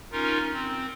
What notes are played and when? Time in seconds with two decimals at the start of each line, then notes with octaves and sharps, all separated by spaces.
0.12 C#4 D#4 F4 A#4
0.53 C4